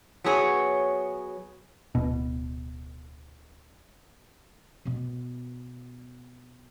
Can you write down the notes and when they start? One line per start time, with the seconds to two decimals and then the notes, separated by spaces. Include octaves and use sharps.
0.24 F#3 B3 G#4 C#5
1.95 D1 B2
4.85 B2 B3